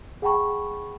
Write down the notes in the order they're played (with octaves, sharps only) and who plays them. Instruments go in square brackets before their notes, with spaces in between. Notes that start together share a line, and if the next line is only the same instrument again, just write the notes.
[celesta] G#4 F#5 G5 A5 B5 C#6